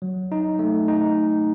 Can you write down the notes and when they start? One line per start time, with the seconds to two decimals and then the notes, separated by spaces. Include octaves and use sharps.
0.02 F#3
0.32 D#4
0.59 A3
0.88 D#4